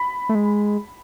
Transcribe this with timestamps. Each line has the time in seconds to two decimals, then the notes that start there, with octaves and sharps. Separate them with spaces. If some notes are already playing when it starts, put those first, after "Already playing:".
Already playing: B5
0.29 A3
0.35 G#3